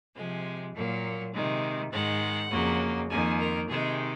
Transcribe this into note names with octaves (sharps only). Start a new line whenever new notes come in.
C3 F3 G#3 G#5
A#2 F#3 A#3
C3 D#3 G#3
G#2 D#3 G#3 F#5
F2 C#3 F#3 A#3
F2 D#3 A#3 G#5
A#4
C3 D#3 G#3 G#4